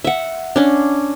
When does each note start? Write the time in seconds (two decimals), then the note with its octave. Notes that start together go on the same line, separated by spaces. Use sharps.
0.04 E5 F#5
0.56 C#4 D4